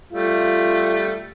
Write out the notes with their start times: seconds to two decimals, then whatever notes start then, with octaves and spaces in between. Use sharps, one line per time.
0.12 G3 A3 F4